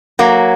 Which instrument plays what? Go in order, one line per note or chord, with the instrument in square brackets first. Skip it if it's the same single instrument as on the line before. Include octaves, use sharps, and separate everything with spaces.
[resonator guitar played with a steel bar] F#3 A#3